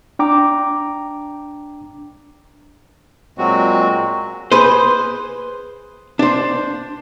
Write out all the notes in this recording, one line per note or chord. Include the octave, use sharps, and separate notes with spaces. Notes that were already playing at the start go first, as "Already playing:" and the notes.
D4 G5 A#5 D6
A#2 F#3 G#3 C4 F#4
G#4 B4 C5
D4 C5